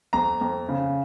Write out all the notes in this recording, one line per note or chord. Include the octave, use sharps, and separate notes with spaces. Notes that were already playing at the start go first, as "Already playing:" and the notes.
F2 A#5
F2
C#3